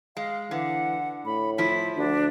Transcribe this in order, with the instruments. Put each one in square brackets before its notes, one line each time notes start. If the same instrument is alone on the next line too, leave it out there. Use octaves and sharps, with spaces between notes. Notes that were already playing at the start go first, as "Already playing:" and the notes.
[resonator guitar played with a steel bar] G#3 [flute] F5
[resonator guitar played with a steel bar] D3 [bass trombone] E3 [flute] F#5
[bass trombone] A2 [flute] B5
[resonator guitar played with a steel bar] F3 E4 [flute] B6
[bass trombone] D2 [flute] D4